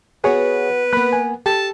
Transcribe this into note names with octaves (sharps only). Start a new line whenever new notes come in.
B3 F#4 G#4 B4 C#5
A#3 B3 B5 F#6
G#5
G4 A4 A5